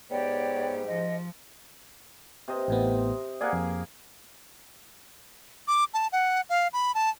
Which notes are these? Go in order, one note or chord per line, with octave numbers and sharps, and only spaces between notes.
G#2 B3 G4 C#5 D5 G5
F3 D#5
C3 C5 D#5
A1 A2 B3
A#3 G#4 D5 F#5
F2
D6
A5
F#5
F5
B5
A5